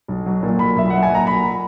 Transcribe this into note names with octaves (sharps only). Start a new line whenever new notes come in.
B1
F#3
A#2
B1 B5
B1 E5
F#3 F#5
G#5
A#2
A#5
B1 B5